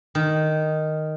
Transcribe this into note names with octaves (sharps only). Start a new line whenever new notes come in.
D#3